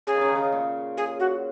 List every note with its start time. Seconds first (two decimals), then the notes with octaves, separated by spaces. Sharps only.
0.07 C#3 G#4
0.15 D#3
0.21 C#3
0.28 D#3
0.35 C#3
0.52 A#2
0.97 G#4
1.20 F#4